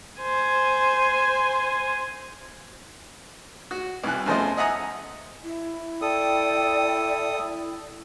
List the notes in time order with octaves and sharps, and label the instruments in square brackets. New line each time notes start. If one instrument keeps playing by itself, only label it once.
[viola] C5 G#5
[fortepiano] F#4
C2 E3 F#6
E2 C#3 F3 A3 C5 D#5
D#5 E5 F#5 G#5 A#5 D#6
[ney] E4
[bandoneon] A4 D#6 [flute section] D5 G5